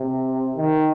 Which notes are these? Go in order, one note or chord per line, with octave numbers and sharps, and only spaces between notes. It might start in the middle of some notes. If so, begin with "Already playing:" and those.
Already playing: C3
D#3